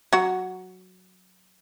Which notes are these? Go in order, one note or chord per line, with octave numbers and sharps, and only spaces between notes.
F#3 F#4